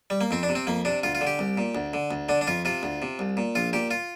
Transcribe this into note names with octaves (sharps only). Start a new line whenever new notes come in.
G3
A#3
F2 C4
D4
C3
C4
F2 A#3
C3 D4
D2 F4
F4
D3
G4
C2
A#2
D2
D3
D2
D3 D4
D4
F2 F4
C3 F4
D2
C3
C2
A#2
A#1 F4
A#2 G4
F4